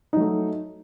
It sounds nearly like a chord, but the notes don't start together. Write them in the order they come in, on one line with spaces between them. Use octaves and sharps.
D#4 F#3 A3